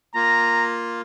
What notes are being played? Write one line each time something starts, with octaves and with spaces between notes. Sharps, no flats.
A#3 F4 A#5